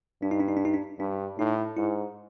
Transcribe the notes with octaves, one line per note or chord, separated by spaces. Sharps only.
G2 D4
D#4
D4
D#4
D4
D#4
D4
G2 D4
A2 D#4
G#2 E4